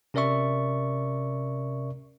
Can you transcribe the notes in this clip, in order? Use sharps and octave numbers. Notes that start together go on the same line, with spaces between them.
C3 C#4 A#4 D5 E5 C#6